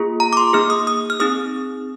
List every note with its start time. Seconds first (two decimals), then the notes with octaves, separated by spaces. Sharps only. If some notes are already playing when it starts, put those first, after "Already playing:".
Already playing: A#3 F4 G#4
0.20 A#5
0.33 D6
0.37 C6
0.53 A#3 D#4 G#4 F6
0.70 D#6
0.87 D#6
1.10 F6
1.20 C4 D#4 G#4 D#6